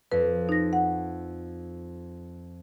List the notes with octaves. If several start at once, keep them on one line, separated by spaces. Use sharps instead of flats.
F2 B4
D#4 A#6
F#5